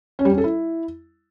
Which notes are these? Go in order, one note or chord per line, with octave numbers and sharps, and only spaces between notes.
C#4
G3
C#4
A4
E4